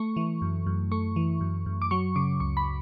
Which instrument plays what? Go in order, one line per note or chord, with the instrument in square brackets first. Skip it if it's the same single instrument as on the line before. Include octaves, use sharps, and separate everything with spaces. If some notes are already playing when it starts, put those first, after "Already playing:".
Already playing: [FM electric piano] A3 C#6
E3
F#2
F#2
A3 C#6
E3
F#2
F#2
D6
F#3 C#6
C#3 D6
C#2 C#6
B5